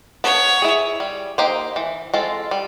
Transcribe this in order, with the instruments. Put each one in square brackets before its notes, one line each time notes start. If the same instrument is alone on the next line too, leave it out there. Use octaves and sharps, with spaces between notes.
[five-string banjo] B3 [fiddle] C#5
[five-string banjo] E4 G#4
G3
A#3 D#4 G4 C5
E3
G#3 C4 F4 A4
G3